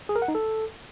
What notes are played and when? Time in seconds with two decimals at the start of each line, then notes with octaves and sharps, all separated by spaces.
0.09 G#4
0.16 A#4
0.22 F#5
0.28 D#4
0.35 A4